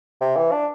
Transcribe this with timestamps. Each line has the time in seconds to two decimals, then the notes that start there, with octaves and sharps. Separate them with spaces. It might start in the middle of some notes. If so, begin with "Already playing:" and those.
0.21 C3
0.36 E3
0.52 D4